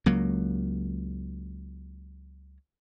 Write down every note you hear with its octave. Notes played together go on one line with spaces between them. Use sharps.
C#2 F#3 A#3